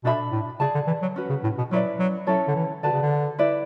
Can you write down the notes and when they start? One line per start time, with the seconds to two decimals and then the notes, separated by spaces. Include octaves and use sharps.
0.04 B2 D4 A4 E5 B5
0.32 A2
0.60 C#3 G#4 D5 A5
0.74 D3
0.87 E3
1.02 F#3
1.16 C#4 F#4 B4
1.30 C#3
1.44 A2
1.58 B2
1.71 F#3 C#4 E4 B4 D5
1.99 F#3
2.27 F#3 C#4 E4 A4 C#5
2.48 D3
2.55 E3
2.83 D3 F#4 B4 D5 A5
2.92 C#3
3.02 D3
3.39 E4 B4 D5